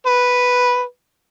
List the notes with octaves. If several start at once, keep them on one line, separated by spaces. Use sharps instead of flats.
B4